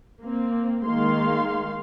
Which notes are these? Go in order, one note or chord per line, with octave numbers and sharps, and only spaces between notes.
A#3 C4
D#3 G#3 A#3 F5 C6